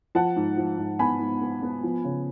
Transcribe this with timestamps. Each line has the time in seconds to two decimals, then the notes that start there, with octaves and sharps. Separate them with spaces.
0.15 F3 F#5 A5
0.36 G#2
0.57 F3
0.78 G#2
0.99 B3 G#5 B5
1.20 G#2
1.41 B3
1.63 B3
1.84 F3
2.04 C#3